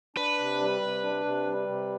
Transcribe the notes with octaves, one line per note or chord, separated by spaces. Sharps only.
D4 B4
C3
G3
C3
D4
C3
G3
C3